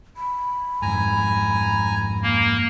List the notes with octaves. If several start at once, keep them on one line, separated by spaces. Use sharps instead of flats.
B5
F2 G#2 G#5 A#5
A#3